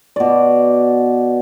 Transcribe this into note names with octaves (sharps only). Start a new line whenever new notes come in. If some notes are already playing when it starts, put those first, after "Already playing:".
B2 D5